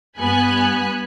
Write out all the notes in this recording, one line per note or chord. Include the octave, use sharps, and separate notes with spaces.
G2 B3 G#5 B5 F#6